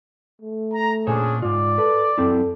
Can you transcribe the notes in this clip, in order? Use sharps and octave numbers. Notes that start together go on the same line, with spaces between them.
A3
A#5
A#2 C#4 D4 G#4 C5 C#5
G#2 F4 D5
A4 B4
F#2 C4 E4 A4